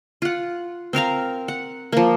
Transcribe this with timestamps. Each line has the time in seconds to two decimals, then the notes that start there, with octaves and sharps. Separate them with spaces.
0.22 F4 F#5
0.93 C4 A#4 F5 A#5
1.48 F#5
1.92 F3 A#3